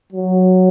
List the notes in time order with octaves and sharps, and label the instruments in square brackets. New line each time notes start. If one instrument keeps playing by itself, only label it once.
[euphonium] F#3